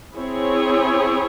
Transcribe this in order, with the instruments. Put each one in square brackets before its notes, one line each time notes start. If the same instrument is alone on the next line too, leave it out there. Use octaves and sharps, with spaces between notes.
[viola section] C4 E4 G#4 C#5